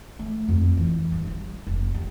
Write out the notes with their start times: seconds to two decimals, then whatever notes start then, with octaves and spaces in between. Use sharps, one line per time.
0.19 A3
0.49 F2
0.77 E3
1.12 G2
1.27 G3
1.67 F1
1.94 G3